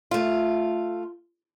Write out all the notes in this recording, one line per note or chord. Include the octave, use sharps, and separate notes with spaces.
A3 F4